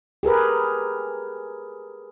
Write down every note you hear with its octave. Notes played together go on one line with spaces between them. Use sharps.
G4 G#4 A#4 B4